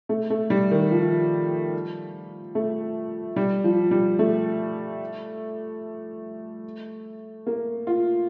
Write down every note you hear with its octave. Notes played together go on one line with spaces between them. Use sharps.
A3
A3
G3
D#3
F3
A3
G3
F3
G3
A3
A#3
F4